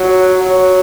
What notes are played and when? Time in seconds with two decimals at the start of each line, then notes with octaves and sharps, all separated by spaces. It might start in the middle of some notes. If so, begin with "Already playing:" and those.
Already playing: F#3
0.41 F#3